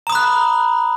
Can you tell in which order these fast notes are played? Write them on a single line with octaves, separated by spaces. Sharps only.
A#5 D#6 B5 F#6